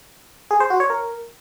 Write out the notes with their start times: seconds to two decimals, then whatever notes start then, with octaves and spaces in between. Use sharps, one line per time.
0.51 G#4
0.60 C5
0.70 F#4
0.80 C#5
0.90 A#4